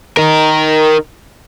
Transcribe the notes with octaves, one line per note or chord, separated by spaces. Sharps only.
D#4 A#4